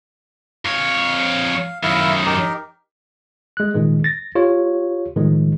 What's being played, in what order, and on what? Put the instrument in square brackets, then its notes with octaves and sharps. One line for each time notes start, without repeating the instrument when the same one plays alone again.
[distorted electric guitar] F2 C#5 [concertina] F5
[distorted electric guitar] F#2 D#3 [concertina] E4 E5 F5
[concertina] D#4 G4 A#4
[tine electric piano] G#3 F#6
A#2 D#3 G#3
A6 A#6
F4 G4 C#5
A2 D#3 F3 G#3